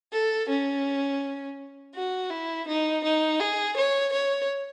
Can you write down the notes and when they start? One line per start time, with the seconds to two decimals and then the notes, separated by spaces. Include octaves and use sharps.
0.12 A4
0.49 C#4
1.95 F#4
2.30 E4
2.68 D#4
3.04 D#4
3.40 G#4
3.77 C#5
4.13 C#5